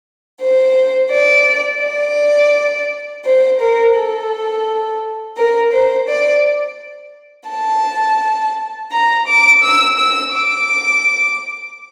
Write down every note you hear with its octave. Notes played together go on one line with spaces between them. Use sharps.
C5
D5
D5
C5
A#4
A4
A#4
C5
D5
A5
A#5
D6
E6
E6
D6